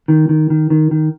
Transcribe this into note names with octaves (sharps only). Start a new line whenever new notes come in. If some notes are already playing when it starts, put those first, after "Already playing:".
D#3
D#3
D#3
D#3
D#3